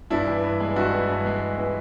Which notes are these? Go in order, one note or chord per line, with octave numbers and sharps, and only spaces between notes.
G2 D4 E4
E3
G2
G#3
G2 E4 F#4
E3
G2
G#3
G2
E3